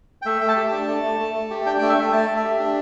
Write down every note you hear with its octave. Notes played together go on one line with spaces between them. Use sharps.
G5
A3 E5
A3 G5
A5
G4
D4
A3
A3
A3
A3
G4
D4 G5
A3 G5
E5
A3 G5
A3 A5
A3
E5
G4
D4